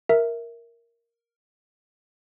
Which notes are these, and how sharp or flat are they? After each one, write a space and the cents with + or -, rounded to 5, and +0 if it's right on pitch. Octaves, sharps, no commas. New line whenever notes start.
A#4 +0 E5 +0